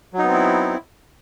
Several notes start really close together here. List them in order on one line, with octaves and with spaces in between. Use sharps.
F#3 D#4 B3 C4 E4